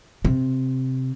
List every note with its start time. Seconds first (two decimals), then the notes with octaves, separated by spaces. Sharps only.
0.25 C3